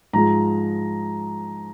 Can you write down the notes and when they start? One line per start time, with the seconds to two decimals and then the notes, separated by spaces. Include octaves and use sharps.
0.13 G#2 F3 G#3 A#5